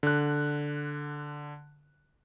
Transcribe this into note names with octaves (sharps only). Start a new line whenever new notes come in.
D3 F#6